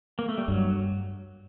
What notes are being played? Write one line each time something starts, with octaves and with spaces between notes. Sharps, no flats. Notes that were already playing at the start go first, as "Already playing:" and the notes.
A#3
A3
G3
G2 F#3